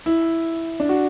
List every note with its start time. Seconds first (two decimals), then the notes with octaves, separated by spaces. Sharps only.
0.06 E4
0.80 D4
0.89 F#4